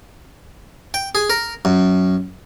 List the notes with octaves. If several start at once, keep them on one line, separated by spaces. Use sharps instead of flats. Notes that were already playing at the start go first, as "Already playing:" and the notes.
G5
G#4
A#4
F#2